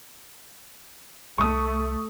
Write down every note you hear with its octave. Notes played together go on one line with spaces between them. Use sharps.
C2 A3 C#6 D#6